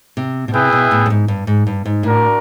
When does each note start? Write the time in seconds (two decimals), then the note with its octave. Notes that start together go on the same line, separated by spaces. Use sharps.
0.17 C3
0.48 B2
0.54 C3 E4 G#4 B4 E5 G5
0.72 B2
0.91 A2
1.06 G2
1.10 G#2
1.28 G2
1.47 G#2
1.67 G2
1.86 G#2
2.03 A2 D4 F#4 A#4 D5